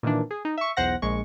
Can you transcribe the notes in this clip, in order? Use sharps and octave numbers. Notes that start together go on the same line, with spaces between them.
A#2 D#3 E3 D4
G#4
D#4
E5 C#6
B1 E2 C5 F#5 A#6
A#1 G#3 C#6